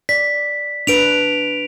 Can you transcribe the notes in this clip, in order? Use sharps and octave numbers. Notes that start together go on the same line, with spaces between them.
D5 B6
D4 B4 D7 F7